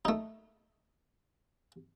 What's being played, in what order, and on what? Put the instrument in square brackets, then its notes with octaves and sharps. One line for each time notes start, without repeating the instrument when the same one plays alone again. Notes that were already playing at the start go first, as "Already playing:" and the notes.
[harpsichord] A3 D#4